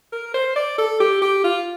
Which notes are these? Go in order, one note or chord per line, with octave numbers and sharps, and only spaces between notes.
A#4
C5
D5
A4
G4
G4
F4